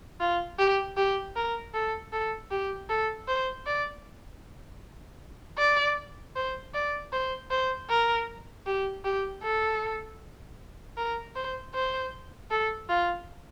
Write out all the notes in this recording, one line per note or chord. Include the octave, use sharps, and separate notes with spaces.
F4
G4
G4
A#4
A4
A4
G4
A4
C5
D5
D5
C5
D5
C5
C5
A#4
G4
G4
A4
A#4
C5
C5
A4
F4